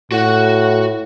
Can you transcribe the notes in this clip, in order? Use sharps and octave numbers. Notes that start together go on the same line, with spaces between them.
A2 F#4 F#5